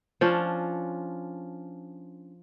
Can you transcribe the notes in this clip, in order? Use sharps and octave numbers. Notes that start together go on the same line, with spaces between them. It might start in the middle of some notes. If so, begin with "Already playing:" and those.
F3 C#4 D4